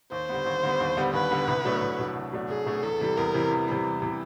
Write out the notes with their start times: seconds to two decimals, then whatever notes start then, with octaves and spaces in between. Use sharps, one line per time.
0.12 D#2 C5
0.29 D3 G3 B3
0.46 D#2
0.63 D3 G3 B3
0.80 D#2
0.97 D3 G3 B3
1.13 D#2 B4
1.31 D3 G3 B3
1.48 C2
1.65 B2 F#3 A3 D4
1.81 C2
1.99 B2 F#3 A3 D4
2.15 C2
2.33 B2 F#3 A3 D4
2.49 C2 G#4
2.66 B2 F#3 A3 D4
2.83 E2 A4
3.01 C3 E3 G3
3.17 E2 A#4
3.34 C3 E3 G3
3.51 E2
3.68 C3 E3 G3
3.85 E2
4.02 C3 E3 G3